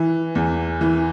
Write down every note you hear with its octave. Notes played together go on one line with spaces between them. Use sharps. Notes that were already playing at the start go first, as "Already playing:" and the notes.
Already playing: E3
E2
E3